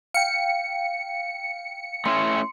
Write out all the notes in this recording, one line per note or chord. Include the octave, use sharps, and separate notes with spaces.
F5 G5 C#7
A3 C#4 E4 C6